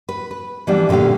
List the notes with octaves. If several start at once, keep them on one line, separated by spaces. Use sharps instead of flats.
B4
B4
E3 F3 G3 B3 D4
A#2 D3 C#4 G4 F5